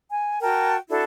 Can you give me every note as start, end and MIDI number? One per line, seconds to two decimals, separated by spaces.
0.10 0.40 80
0.42 0.76 66
0.42 0.76 70
0.42 0.76 79
0.42 0.76 81
0.90 1.03 62
0.90 1.03 64
0.90 1.03 66
0.90 1.03 69